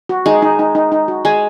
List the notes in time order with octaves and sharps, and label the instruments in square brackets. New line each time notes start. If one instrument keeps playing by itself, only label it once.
[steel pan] F#4
[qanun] G#3 [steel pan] D#4
[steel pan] D#4
D#4
D#4
D#4
F#4
[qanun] G#3 [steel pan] G#5